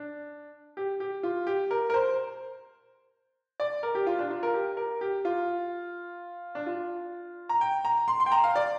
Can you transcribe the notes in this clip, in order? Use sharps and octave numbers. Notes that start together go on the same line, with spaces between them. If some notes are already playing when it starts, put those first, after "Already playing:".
Already playing: D4
G4
G4
F4
G4
A#4
A#4
C5
D5
A#4
G4
F4
D4
F4
A#4
G4
A#4
G4
F4
D4
F4
A#5
G5
A#5
C6
C6
G5
A#5
F5
D5